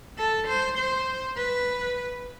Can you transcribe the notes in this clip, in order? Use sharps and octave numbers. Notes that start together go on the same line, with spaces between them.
A4
C5
C5
B4